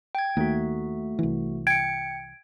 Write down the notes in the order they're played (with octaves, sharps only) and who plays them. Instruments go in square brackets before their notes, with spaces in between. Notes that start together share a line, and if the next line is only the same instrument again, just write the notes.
[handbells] G5 G#6
[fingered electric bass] D#2 [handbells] A3 F#4
[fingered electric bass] C2 E3
[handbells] G5 C#7 [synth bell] G#6 D7